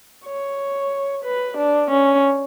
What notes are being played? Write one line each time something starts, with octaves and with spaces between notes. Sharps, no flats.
C#5
B4
D4
C#4